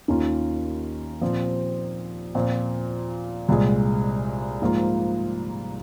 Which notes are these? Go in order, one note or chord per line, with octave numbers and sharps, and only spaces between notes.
D#2 D#3 A#3 C#4 F4
A#2 F3 C4
A#2 F3 C4 F4
C2 A#2 G#3
G#2 F3 A#3 F4